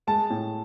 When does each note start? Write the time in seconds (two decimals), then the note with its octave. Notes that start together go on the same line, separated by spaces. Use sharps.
0.07 G#3 A5
0.30 A2